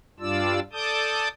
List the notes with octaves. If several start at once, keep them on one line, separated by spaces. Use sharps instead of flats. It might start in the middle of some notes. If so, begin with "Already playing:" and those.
G2 G3 D4 F4 D5 E6
A4 D5 A5 D6 D#6 G6